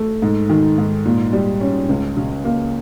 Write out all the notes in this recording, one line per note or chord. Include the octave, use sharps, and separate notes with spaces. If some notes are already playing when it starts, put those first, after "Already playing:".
Already playing: A3
G#2
D#3
G#2
A#2
G3
C#4
C#2
C#3
A#3